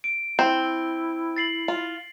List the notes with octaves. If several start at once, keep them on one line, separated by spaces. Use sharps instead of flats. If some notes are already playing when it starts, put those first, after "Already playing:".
D7
C4 E4
A6 C7 F#7
F4